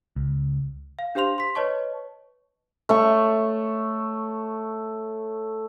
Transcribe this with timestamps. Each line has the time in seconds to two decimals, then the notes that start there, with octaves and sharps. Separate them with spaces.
0.16 C#2
0.99 F5
1.15 D4 G4 C5 F5 C6 F7
1.38 C6 B6
1.55 B4 C#5 D#5 A5 C#6
2.89 A3 C#5 C#6